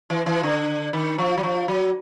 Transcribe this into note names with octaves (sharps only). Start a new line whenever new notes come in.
E3
E3
D3
D#3
F3
F#3
F3
F#3